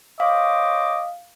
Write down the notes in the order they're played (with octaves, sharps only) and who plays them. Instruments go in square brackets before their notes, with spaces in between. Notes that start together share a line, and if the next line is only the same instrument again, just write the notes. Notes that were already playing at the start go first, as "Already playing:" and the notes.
[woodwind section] C5 C#5 D6 [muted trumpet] D#5 [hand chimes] F5